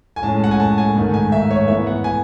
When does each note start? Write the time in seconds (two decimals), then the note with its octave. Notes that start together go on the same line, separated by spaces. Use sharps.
0.16 G#5
0.23 A2 G#3 C#4 A5
0.44 F#5
0.51 G#5
0.60 A5
0.78 G#5
0.95 G#2 D#3 A3
1.14 G#5
1.32 E5
1.51 C#5
1.68 G#2 E3 B3 E5
1.87 F#5
2.04 G#5